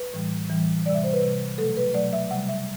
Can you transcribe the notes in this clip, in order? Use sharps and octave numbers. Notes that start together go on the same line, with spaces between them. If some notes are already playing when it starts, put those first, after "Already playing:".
Already playing: B4
A2 E3 G3
A2 E3 G3
C3 G3 D5
E5
C5
B4
C3 G3
B2 F#3 A3 A4
B4
B2 F#3 A3 D5
E5
C3 G3 F#5
E5